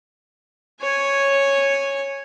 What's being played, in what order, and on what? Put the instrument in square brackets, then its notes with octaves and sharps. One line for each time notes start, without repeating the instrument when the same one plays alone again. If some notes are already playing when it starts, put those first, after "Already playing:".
[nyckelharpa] C#5 G#5